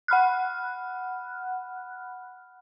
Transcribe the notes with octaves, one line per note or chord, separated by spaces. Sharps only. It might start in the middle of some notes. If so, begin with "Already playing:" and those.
F#5 B5 F6 F#6